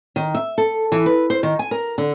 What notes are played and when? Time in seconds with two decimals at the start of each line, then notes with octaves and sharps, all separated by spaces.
0.16 D#3
0.34 E5
0.58 A4
0.92 E3
1.06 B4
1.30 C5
1.43 D#3
1.59 G#5
1.71 A#4
1.98 D3